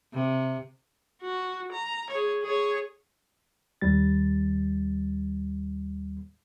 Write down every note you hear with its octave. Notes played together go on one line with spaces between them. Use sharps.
C3
F#4
A#5
G#4 C#5
G#4 C#5
D#2 G3 A6